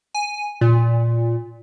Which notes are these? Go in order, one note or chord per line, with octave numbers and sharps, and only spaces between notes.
G#5
A#2